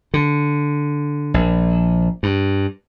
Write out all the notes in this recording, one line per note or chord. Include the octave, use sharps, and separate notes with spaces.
D3
A#1
G2